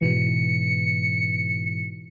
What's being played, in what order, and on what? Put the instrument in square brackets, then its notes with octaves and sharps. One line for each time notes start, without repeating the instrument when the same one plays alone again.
[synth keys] G#2 B2 E3 [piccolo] C#7